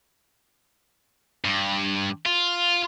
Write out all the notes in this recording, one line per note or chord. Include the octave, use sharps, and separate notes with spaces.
G2
F4